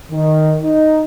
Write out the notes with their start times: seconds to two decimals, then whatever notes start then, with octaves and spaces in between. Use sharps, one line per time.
0.11 D#3
0.62 D#4